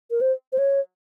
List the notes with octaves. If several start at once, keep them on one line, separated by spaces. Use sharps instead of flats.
A#4
C5
C5
C#5